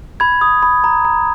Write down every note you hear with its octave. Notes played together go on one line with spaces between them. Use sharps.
B5 G#6
D#6
B5
A#5
A#5